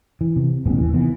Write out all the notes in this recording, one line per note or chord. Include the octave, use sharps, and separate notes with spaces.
E3
C3
D#1 A1 C3 B3
D#2 E3
C3 D#3 E3 B3